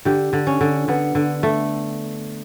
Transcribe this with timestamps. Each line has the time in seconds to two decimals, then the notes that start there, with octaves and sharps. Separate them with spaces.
0.05 D3 G4
0.33 D3
0.47 C#4
0.61 D3
0.88 D3 B3
1.15 D3
1.43 A3